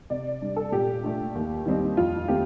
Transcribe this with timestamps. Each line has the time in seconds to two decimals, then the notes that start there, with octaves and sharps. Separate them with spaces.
0.10 C3 D5
0.41 G3 D4
0.56 A4
0.72 A#2 G4
1.03 A3 D4
1.35 D#2
1.66 D#3 G3 C4 D#4
1.97 F2 F4
2.28 D#3 A3 C4 G4